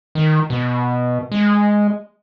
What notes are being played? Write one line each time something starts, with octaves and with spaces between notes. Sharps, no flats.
D#3
B2
G#3